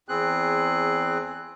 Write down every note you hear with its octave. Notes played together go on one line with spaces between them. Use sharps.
E2 C4 G#4 F#6